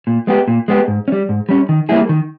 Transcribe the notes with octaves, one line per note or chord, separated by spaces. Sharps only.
A#2
G#3 B3 G4
A#2
G#3 B3 G4
G#2
C#4
G3
G#2
G3 C#4
D#3
G3 A#3 E4 G#4
D#3